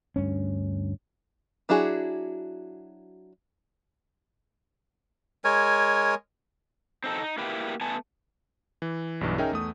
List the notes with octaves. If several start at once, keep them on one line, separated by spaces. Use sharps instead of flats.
D2 G2 C#4
F#3 D4 E4 F#4 G#4
G#3 A#4 C#5 G#5
C4 D#4 A4
D#4
A#3 E4 G4 B4
A3 B3 G#5 A5
E3
B1 G2 E3
C#4 D#4 G#4 A#4 E5 G5
E2 A3 D#6